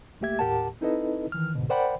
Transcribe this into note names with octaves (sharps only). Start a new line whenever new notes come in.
C2 A3 A#3 G4 E5 G#6
D#2 A2 G4 A#4 F#5 A5
C4 D#4 E4 A4 B4 D#5
D#3 E3 F6
C#2 G#2 B2 D3
A#4 C5 D5 F#5 G5 B5